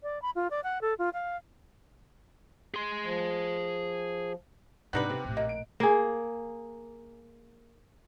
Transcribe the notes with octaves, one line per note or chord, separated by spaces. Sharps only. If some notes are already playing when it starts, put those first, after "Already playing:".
D5
B5
F4
D5
F#5
A4
F4
F5
G#4 C6
F3
G#2 C3 B3 D4 D#4 B4 F#6
C3 C4
A#1 A2
A#3 D#5
D7
A#3 G#4